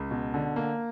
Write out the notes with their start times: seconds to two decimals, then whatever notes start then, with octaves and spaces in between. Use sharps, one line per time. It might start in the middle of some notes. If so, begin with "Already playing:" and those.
Already playing: C#2
0.11 B2
0.34 D3
0.56 A#3